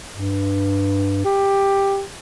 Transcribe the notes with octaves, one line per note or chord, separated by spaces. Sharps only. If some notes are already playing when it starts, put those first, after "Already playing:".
G2
G4